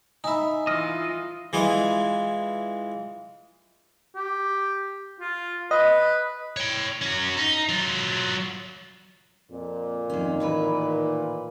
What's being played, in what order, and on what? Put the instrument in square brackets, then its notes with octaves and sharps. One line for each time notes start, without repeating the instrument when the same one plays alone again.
[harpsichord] D#4 E5 [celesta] G#5 B5
[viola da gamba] E3 F4 [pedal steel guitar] D#5 [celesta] F6
[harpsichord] E3 G#3 F4
[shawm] G4
F4
[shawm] B4 [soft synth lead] D#5
[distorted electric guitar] C#5 G5
C#4 F#4
D#4
F#3 F4
[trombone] F2 [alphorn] A#2
[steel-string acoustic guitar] F2 C#4 [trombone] D#3
[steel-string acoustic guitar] A2 E3 B4